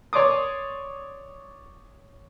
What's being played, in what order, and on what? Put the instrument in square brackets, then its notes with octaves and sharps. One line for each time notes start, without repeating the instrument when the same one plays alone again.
[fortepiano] C#5 D5 C6 D6 D#6